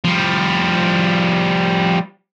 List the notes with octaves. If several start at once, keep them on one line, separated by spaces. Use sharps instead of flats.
F3 G3